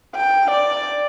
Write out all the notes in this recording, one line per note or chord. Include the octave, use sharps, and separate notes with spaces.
G5
D5